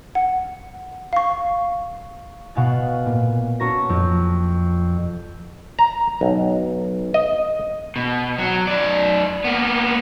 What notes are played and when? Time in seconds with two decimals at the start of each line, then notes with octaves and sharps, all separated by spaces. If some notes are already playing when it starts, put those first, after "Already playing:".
0.15 F#5
1.13 F5 C#6
2.55 B2 F5 F#5 G#5 F#6 A6
3.06 A#2
3.60 C#4 F#4 A4 C#5 A#5 A#6
3.89 F2
5.79 A#5
6.21 B1
7.14 D#5
7.96 B2
8.38 F#3
8.67 F#2 D5
9.44 A#3 B3